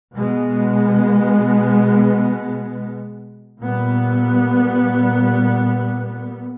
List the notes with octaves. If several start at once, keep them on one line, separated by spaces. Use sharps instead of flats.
B2 G#3 B3
A#2 G3 B3